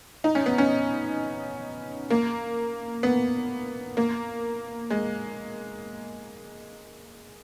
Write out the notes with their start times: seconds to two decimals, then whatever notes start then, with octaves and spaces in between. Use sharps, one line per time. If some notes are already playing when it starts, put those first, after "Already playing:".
0.24 D#4
0.35 C#4
0.46 B3
0.58 C#4
2.10 A#3
3.03 B3
3.97 A#3
4.90 G#3